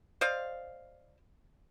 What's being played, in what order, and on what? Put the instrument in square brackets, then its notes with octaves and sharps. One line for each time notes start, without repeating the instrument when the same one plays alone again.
[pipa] C5 D5 D#5 F5